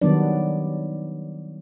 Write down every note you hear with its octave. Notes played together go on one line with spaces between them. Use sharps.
D#3 F#3 G3 B3 D4 D5